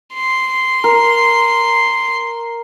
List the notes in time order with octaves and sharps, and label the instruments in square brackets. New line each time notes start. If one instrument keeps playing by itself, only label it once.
[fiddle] C6
[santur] A#4